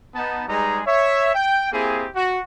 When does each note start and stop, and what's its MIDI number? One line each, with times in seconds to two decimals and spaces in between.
0.15 0.44 59
0.15 0.44 63
0.15 0.44 81
0.48 0.81 55
0.48 0.81 56
0.48 0.81 63
0.48 0.81 68
0.48 0.81 71
0.48 0.81 82
0.86 1.34 73
0.86 1.34 76
1.35 1.71 79
1.72 2.06 58
1.72 2.06 60
1.72 2.06 64
1.72 2.06 67
1.72 2.06 68
2.15 2.39 66